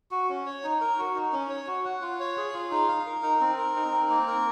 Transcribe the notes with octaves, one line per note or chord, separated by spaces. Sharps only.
F#4
C#4
C#5
D#4
A#4
F#4
D#4
C#4
C#5
F#4
F#5
F4
C#5
G#4
F4
D#4
F5
A#4
D#4
C4
A#4
D#4
C4
A#3
A#4